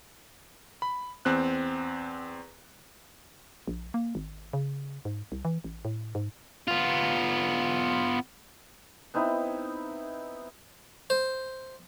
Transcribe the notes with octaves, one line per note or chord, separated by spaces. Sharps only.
B5
E2 C4 F#6
A#1
A#3
G#1
C#3
G#2
C2
E3
A1
A2
G#2
B3 F4
B3 C4 D#4 E4
C5